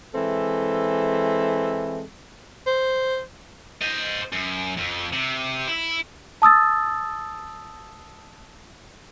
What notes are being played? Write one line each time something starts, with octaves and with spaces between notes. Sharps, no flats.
E3 G#3 C4 A4 E5
C5
C5 D#5
F#2
F2
C3
E4
A5 D#6 E6 A6